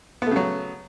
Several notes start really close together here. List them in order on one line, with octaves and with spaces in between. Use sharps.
B3 A3 C#3 F#3